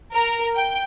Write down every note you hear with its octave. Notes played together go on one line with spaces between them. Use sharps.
A#4
G5